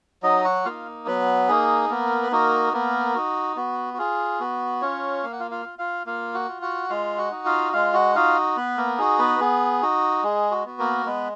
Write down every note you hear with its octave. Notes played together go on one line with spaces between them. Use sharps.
F#3 D#4 D#5
F#4 F#5
A#3 D#4 F4 F5
F#3 B3 B4
A#3 D#4 G#4
A#3 B3 A#4
B4
A#3 D#4 F#4 A#4
A#3 B3 A#4
D#4 F#4
B3 F#4
F#4
F4 G#4
B3 F#4
C#4 F4 C#5
A#3 F5
F#5
F4 F5
F4 F5
F4
F4 F5
A#3 F4 F5
F#4 F#5
F4
F#4 F#5
G#3 F4 F5
F#4 F#5
D#4 F#4
F4 F5
G#3 F4 F5
F#4 F#5
D#4 F4 F#4 F5
B3 B4
A#3 A#4
D#4 F#4 G#4
B3 B4
B3 G#4
D#4 F#4
G#3 G#4
F#4
B3 F#4
A#3 A#4
G#3 B3 B4